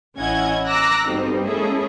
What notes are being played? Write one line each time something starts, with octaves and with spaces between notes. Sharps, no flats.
A1 C#4 E4 D#5 F#5 G#6
A#5 D6 E6 F#6 A#6
G2 B2 D3 G3 C4 D#4
G#3 A#3 C#4 E4 G#4 A4